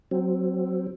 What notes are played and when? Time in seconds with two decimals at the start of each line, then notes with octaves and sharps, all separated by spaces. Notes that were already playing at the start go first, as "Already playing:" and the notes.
0.11 F#3 C4